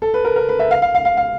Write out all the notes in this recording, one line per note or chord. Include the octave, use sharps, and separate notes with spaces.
A4
B4
A#4
A#4
B4
E5
F5
F5
F5
F5
F5